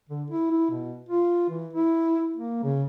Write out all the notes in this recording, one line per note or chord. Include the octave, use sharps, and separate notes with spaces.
D3
E4
E4
B2
F4
E3
E4
A#3
C#3